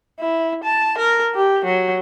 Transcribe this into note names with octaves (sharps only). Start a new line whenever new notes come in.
E4
A5
A#4
G4
F#3